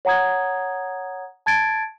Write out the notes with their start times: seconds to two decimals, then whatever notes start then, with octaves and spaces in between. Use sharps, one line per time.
0.05 C#5 F#5 A#5 D#6 G#6
1.46 A5 G#6 A6 D7